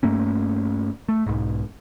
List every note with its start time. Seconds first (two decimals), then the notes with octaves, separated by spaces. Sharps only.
0.03 G2 A3 A#3 C#4
1.09 A3
1.26 B1 G#2